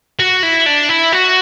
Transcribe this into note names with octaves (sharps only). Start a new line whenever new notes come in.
F#4
E4
D4
E4
F#4